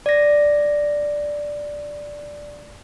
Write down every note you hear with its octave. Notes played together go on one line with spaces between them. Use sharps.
D5 A#6